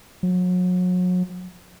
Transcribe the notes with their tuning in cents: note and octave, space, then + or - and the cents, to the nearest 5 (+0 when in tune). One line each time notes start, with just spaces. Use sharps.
F#3 -35